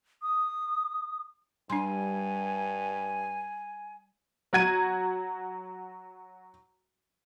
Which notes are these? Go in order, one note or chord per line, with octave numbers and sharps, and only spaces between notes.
D#6
G2 G3 D4 G#5 C6
F#3 F#4 G#6 D#7